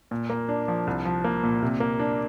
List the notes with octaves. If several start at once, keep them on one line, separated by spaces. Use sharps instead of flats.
A#2
A#3
D4
F3
C2
F3
A#3
A#2
C3
A#3
D4